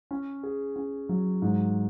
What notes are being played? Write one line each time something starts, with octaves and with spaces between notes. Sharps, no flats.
C#4
G#4
C#4
F#3
G#2